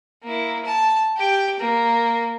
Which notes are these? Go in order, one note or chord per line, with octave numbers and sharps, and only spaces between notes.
A#3 E4
A5
G4 G5
A#3